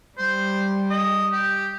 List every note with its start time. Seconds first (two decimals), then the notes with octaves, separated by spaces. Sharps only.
0.18 G3 C5
0.90 D#5
1.32 G4